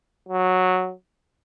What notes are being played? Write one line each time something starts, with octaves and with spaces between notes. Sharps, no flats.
F#3